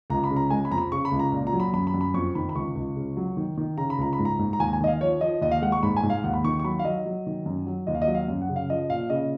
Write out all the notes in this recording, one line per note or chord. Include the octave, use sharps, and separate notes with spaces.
C#2 A#5
B5
C#3
A#5
G#3 G#5
B5
F2 A#5
B5
C#3 C#6
B5
C#2
A#5
A#2
A#5
F#3
B5
F#2 B5
B5
F#2
B5
F2 C#6
D#3 B5
B5
C#2 C#6
C#2
C#3
F#3
D#3
D#3
C#3 A#5
B5
C#2 A#5
B5
G#2
A#5
G#2
A#5
D#2 G#5
G#5
D#3 D#5
F5
F3 C#5
F3 D#5
D#2 D#5
F5
G#3 F#5
C#6
G#2 B5
G#5
G#2
F5
D#2 F#5
B5
D#3 C#6
C#6
F#3 B5
F5
F#3 D#5
F#3
D#3
F#2
F#3
D#2 D#5
F5
D#5
F#3
F5
F#2
F#5
C#3
F5
F3 D#5
A#2 F5
C#3 D#5